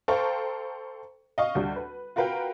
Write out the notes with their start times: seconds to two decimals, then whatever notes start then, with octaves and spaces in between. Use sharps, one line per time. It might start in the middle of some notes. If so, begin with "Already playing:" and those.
0.08 A4 C5 F5 G5 A#5 C#6
1.38 D#5 F5 C#6
1.55 D2 G3
1.76 B4
2.16 F4 F#4 A#4 B4 F5 G5